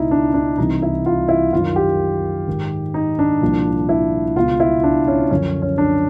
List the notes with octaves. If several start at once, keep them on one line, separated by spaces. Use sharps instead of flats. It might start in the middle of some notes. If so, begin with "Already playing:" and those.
Already playing: C#2 B2 D#4 E4
D4
D4
C2 C3 E3 D#4
E4
F4
E4
F#2 D#3 F4
G4
G#2 D#3
D#4
D4
C2 A#2 F3
E4
C#2 B2 F4
E4
D4
C#4
F#2 D3 F3 C#4
C#4
D4